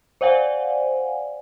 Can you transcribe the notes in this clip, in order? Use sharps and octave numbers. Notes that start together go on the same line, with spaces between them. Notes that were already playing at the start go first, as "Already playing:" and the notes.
C5 D5 F5 F#5 G#5